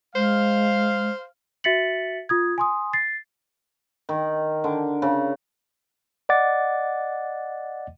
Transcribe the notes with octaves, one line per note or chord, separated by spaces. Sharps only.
G#3 C5 F5
F#4 E5 A6 B6 C#7 F#7
F4 D#6 G#6
G#5 C6 D#6
A6 C7
D#3
D3
C#3
D5 D#5 F#5 D6 A6